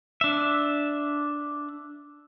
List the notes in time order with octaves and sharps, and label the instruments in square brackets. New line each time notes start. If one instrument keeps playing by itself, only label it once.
[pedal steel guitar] D4 E5